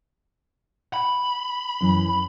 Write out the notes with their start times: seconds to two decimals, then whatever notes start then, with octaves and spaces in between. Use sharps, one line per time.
0.94 B5
1.81 F#2 E3